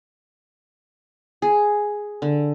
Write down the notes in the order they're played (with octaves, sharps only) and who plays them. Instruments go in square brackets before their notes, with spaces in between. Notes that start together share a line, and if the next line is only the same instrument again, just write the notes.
[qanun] G#4
D3